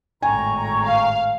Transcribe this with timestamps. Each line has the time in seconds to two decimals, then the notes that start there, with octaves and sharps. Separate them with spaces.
0.22 G#1 A2 G5 G#5 A#5 C#6
0.85 F5